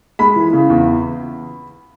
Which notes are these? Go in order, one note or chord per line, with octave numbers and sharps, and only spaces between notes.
G#3 B5
E3
C#3
E2